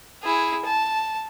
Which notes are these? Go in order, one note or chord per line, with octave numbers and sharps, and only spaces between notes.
E4 G#4
A5